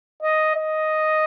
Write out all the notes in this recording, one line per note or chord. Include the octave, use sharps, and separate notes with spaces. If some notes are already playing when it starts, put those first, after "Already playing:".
D#5
D#5